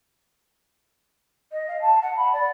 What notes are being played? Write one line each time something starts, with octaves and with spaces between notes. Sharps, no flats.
D#5
F5
A5
F#5
B5
D5